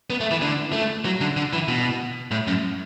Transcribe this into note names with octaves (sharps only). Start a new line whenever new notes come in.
B3
A3
E3
D3
A3
F#3
D3
D3
E3
B2
A2
F#2